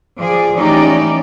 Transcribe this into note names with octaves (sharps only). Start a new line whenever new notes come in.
F3 G#4 D5
E3 A3 C#4 D#4 G4 D5